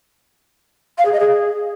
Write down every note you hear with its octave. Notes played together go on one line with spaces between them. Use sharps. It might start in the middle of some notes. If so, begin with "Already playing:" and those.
F5
G#4
D#5
G#4